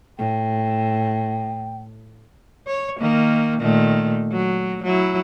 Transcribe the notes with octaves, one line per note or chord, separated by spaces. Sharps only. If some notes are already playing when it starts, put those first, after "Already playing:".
A2 G5
C#5
D#3 A#3
A#2 D#3 A3
F#3
F#3 E4